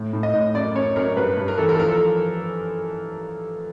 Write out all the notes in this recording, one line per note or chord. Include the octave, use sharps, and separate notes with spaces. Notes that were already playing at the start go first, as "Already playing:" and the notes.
Already playing: A2
A2
D#5
A2
F#2 D5
F#2 C#5
F#2 A#4
G2 B4
G2
A#4
E3 A4
A#4
A4
F3 A#4
A4
A#4